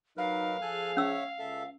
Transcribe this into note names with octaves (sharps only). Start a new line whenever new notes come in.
F#3 D#4 A#4 B4 F5
F3 G#4 A4 G#5 F#6
C#4 C#5 E5 E6
C#2 A4 E5